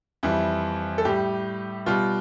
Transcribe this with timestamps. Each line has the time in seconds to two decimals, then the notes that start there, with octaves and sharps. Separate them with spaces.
0.23 F2 E3 G3 E4
0.98 A4
1.05 A2 G3 G4
1.86 B2 G3 F4